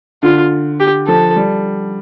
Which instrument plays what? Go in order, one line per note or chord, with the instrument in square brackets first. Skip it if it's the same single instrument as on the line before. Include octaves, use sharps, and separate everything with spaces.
[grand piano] D3 [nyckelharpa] F4
[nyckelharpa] G4
[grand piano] F3 [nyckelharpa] A4
[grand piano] G3